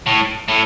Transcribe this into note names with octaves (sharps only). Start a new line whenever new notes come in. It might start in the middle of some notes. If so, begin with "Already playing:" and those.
A2
A2